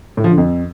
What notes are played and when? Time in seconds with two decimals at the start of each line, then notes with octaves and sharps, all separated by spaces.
0.17 A2
0.24 F3
0.31 D3
0.38 F2